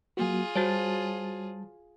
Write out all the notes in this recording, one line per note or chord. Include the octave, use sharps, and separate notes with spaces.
F#3 A#3 F4 F#4 G#4
G3 F#4 C5 C#5 A5 A6